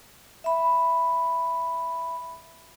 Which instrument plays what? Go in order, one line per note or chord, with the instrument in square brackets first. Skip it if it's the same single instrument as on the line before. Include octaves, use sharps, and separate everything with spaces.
[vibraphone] E5 B5